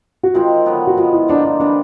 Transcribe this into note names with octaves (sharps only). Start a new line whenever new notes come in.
F#4
D#3 G#3 C4 F4
D3 F#3 B3
F#4
F3 G#3 B3 F4
E4
D3 F3 A#3 D4 D#4
D4
C3 E3 G3 D4